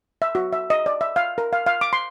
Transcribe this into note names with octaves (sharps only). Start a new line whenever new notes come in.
E5
F#4
E5
D#5
D5
E5
F5
A#4
F5
F5
D6
C6